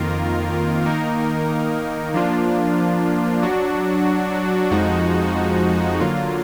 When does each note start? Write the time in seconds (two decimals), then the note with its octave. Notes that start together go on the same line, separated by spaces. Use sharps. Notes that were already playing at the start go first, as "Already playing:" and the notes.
Already playing: F2 D#3 A#3 F4 A#4
0.85 D#3 A#3 D#4 A#4
2.14 F3 A#3 D4 F4
3.43 F#3 D4 F#4
4.71 F2 F3 G#3 D#4 F#4
6.00 D3 F#3 A#3 F4